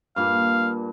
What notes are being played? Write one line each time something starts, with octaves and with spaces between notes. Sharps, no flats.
G2 A#2 F5